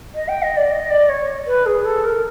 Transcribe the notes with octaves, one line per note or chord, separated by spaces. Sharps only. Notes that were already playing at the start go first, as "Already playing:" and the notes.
D#5
G5
D#5
D5
D#5
D5
C#5
B4
G#4
A4
A#4